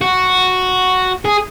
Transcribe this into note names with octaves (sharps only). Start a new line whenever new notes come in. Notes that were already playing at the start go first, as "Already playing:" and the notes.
F#4
G#4